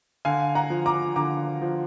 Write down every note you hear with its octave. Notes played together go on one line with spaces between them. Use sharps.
D3 F5 G#5
F#5 A#5
F3
A#5 D6
D3 A#5 D6
F3